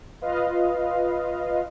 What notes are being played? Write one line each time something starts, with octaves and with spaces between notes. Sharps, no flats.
F4 B4 D#5 F5